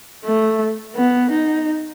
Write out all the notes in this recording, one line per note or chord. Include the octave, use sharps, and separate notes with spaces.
A3
B3
D#4